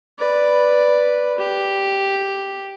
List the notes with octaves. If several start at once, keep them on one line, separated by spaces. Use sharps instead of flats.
B4 D5
G4